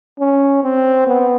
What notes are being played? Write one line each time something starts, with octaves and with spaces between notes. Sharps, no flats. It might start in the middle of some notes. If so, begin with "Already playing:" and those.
C#4
C4
B3